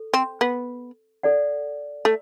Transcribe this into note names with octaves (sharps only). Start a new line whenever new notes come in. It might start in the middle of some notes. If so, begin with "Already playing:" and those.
Already playing: A4
C4
B3
A4 D5 F#5
A3